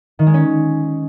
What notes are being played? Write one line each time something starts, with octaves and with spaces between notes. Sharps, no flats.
D#3
G#3
C#4